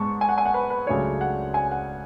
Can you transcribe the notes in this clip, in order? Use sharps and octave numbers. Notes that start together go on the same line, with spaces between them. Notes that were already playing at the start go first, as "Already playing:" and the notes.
Already playing: G#2 G#3 B3 A5 C#6
G#5
F#5
G#5
F#5
B4
B4
C#2 C#3 F#3 A3 D4 C#5
F#5
G#5
F#5